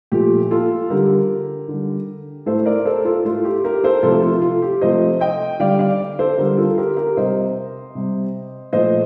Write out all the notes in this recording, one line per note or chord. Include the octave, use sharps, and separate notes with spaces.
A#2 F3 A3 G4
F4 A4
D3 G3 G4 A#4
D3 G3
A2 A3 A4 C5
A#4 D5
A4 C5
F4 A4
A2 A3 F4
G4
G4 A#4
A4 C5
C3 F3 A3 F4 A4
F4
F4
G4
C3 F3 A3 C5 D#5
D#5 G5
D3 G3 D5 F5
D5 F5
A4 C5
D3 G3 G4 A#4
F4 A4
G4 A#4
G4 A#4
C3 G3 C5 D#5
C3 G3
A#2 F3 A3 C5 D#5